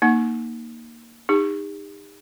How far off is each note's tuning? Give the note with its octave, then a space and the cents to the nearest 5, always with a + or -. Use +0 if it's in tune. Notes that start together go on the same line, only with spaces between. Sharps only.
A#3 +0 D#4 +0 F#5 +0
D#4 +0 G4 +45